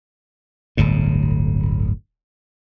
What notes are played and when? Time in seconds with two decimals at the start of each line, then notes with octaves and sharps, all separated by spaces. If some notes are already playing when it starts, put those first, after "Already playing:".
0.77 D1 G1 A2